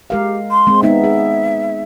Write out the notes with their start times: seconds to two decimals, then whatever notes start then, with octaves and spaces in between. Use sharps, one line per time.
0.10 G#3 G4 A#4 F5
0.51 C6
0.67 G#3 C4
0.83 G#3 B3 D#4 E5
1.04 G#4